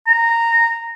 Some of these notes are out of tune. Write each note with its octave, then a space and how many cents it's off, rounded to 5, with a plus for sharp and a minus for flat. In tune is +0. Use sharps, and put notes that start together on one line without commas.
A#5 -15